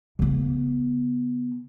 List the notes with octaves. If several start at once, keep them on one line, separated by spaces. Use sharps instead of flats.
C#3 B3